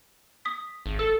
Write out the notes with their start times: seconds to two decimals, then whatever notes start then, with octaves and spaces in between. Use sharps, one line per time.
0.45 D#6 B6
0.86 G#1
0.99 A4 E6